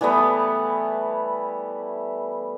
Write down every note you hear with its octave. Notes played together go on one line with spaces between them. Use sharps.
E3 G3 A3 B3